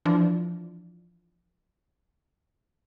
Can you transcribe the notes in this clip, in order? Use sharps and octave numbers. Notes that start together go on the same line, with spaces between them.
E3 F3 D4